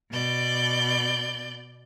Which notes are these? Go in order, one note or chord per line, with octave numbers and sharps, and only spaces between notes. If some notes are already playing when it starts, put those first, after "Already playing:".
B2 D5 G6